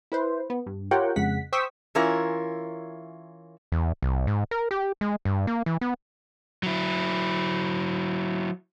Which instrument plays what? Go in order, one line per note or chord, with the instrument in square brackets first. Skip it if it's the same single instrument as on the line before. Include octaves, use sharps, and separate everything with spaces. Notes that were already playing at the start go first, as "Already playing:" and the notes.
[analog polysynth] E4 B4 C5
B3
G2
F4 G4 A#4 C#5 F#5 G5
F2 C#3 G#3 F#5 B6
C5 G5 C#6 D#6 E6 B6
[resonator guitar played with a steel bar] E3 C#4 E4 F4 A#4 C#5
[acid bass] E2
C2
G#2
A#4
G4
G#3
G2
A#3
E3
B3
[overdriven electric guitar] F#3 E4